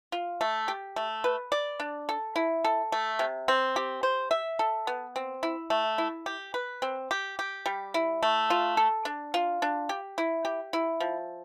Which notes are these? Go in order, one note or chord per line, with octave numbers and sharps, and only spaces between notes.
F4
A3
G4
A3
B4
D5
D4
A4
E4
A4
A3
C3
C4
G4
C5
E5
A4
B3
C4
E4
A3
E4
G4
B4
C4
G4
G4
G3
E4
A3
F4
A4
D4
F4
D4
G4
E4
G4
E4
F3